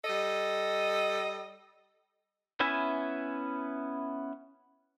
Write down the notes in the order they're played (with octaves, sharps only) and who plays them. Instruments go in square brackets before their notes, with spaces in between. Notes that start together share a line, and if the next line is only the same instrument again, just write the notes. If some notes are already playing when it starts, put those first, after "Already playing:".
[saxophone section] G3 A4 D#5
[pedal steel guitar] B3 C#4 E4 E5 G#5